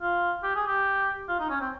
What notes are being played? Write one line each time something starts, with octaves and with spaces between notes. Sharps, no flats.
F4
G4
G#4
G4
F4
D#4
C#4
C4